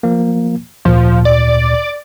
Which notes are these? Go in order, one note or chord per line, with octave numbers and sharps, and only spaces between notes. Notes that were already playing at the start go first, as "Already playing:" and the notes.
F3 A#3
D2 A#2 F3
D5